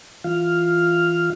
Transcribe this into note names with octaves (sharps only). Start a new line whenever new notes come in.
E3 F4 F5 F6